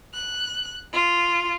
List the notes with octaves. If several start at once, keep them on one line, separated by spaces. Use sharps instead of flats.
F#6
F4